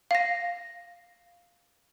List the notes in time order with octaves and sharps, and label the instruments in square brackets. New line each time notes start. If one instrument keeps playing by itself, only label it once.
[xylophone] F5 A#6